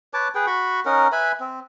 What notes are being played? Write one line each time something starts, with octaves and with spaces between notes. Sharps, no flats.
B4 C#5 A5 D6
G#4 B4 G5
F#4 B5 C#6
C#4 D#4 A#4 F#5
B4 E5 G#5 B5
C4